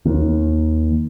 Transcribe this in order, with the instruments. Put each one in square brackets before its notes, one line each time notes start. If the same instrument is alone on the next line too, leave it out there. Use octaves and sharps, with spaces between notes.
[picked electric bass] D#2